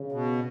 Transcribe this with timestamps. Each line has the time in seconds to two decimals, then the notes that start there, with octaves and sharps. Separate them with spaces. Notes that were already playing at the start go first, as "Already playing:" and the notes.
Already playing: C#3
0.12 B2